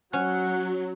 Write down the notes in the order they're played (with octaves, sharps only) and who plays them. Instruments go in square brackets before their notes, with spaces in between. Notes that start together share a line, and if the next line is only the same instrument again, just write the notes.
[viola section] F#3 [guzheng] C#4 [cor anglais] F#5